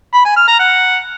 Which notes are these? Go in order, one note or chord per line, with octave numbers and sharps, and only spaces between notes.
B5
G#5
F6
A#5
F#5